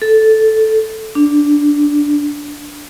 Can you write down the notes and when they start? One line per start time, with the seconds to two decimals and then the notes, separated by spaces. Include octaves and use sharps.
0.02 A4
1.15 D4